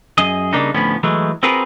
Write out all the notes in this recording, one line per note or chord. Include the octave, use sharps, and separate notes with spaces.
F#2 G#4 D#5
C#3 F3 G3 A#3 D4 D#4
D2 A2 F3 B3 C#4
E3 F#3 G#3 A3
C4 F4 F#4 G#4 A#4 B4